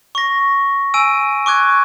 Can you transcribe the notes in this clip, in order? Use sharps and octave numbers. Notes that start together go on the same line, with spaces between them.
C#6 A#6
G#5 E6 D7 D#7
C#6 D6 F#6 G#6